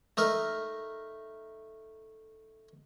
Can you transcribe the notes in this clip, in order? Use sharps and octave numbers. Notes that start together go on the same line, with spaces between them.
A3 D#4 A#4